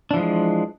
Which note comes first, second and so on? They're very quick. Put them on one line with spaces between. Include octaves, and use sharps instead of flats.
D4 E3 F3 G#3